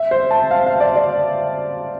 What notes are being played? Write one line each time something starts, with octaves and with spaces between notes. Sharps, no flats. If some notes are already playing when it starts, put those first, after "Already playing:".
Already playing: E5
C5
A5
F5
F5
D5
D5